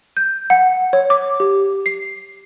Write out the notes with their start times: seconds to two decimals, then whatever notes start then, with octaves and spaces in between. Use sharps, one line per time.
0.17 G6
0.50 F#5
0.93 C#5
1.10 D6
1.40 G4
1.86 C7